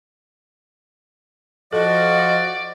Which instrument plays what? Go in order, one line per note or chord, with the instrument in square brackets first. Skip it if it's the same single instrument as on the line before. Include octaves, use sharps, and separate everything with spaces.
[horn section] F3 F#4 [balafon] A4 [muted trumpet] D5 [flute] D#5